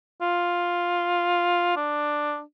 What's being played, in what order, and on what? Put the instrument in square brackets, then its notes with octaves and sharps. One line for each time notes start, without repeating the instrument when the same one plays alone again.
[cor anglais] F4
D4